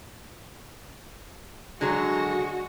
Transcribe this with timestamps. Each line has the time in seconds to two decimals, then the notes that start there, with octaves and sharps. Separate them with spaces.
1.81 D3 F#3 G#3 F#4